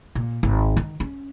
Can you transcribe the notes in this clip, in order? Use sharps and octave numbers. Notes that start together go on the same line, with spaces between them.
A#2
G#1
D#3
C#4